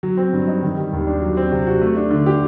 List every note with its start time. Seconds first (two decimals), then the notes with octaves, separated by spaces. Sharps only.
0.03 F#3
0.17 C4
0.33 G2
0.48 D#4
0.62 D#3
0.77 G3
0.93 D#2
1.07 D4
1.21 F#3
1.37 C4
1.52 C3
1.67 F#4
1.81 A3
1.97 D4
2.11 D3
2.26 G4